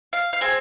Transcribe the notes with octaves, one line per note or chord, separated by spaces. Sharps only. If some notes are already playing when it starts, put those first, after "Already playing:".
F5
F5
C4 G#4 G#5